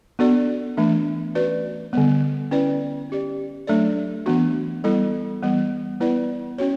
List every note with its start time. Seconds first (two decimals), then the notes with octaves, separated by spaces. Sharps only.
0.19 B3 D4 F#4 A4 D5
0.77 E3 A3 D4
1.35 C#4 F#4 B4 D5
1.93 D3 G3 B3
2.51 C#4 E4 B4 D5
3.10 C#4 G4 D5
3.67 F#3 A3 D4 A4 D5
4.26 E3 B3 D4 F#4
4.84 G3 B3 E4 A4
5.43 E3 G3 B3
6.00 B3 E4 B4 D5
6.58 C#4 F#4 C#5